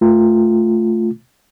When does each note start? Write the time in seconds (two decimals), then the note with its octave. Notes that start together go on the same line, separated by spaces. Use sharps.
0.01 A3 F4